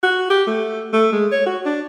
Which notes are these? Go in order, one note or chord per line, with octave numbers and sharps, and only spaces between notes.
F#4
G4
A3
A3
G#3
C#5
F#4
D4